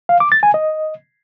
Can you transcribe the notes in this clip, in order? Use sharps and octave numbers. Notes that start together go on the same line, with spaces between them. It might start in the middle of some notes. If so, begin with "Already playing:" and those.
F5
D6
A6
G#5
D#5